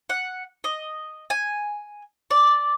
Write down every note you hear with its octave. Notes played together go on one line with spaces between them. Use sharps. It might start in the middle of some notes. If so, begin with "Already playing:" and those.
F#5
D#5
G#5
D5